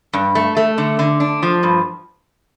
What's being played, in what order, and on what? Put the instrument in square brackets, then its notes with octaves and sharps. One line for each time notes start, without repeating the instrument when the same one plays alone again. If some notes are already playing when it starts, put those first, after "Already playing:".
[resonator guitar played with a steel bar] G2
A3
A3
D3
D3
D4
F3
G2